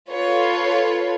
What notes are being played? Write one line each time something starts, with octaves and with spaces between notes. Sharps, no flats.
F4 A4 B4 C#5